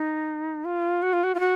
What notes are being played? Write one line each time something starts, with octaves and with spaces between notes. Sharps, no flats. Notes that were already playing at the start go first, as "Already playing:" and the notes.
Already playing: D#4
F4
F#4
F4
F#4
F4
F#4